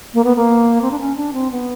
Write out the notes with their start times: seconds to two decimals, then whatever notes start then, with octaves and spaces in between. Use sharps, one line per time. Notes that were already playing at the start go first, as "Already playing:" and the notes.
0.14 A#3
0.24 B3
0.36 A#3
0.82 C4
0.91 D4
1.00 C#4
1.16 D4
1.33 C4
1.51 B3